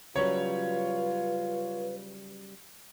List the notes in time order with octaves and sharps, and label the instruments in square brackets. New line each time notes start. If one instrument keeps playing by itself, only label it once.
[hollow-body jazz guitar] C#3 F#3 G3 [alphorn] F4 [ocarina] B4 [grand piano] C#5